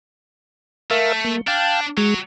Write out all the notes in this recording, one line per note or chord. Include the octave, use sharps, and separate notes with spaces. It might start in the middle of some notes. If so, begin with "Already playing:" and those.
A3 A#4 E5 F5
A#3
D4 F5 G5 A5
F#3 G#3